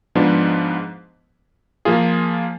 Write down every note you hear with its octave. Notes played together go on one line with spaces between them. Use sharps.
G#2 F3 B3 D4
F3 A#3 F4 G#4